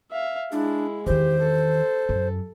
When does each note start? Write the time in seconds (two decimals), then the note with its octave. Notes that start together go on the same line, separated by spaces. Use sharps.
0.11 E5 F5
0.52 G#3 D4 E4
1.07 E2 D#3 G4 C5
1.43 A4
2.09 F#2